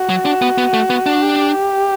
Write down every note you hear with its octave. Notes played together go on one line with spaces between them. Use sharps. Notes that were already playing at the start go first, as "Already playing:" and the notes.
Already playing: F#4
F#3
D4
B3
B3
A3
B3
D4
G4